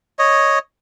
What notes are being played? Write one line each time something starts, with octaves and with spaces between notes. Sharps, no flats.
C#5 D#5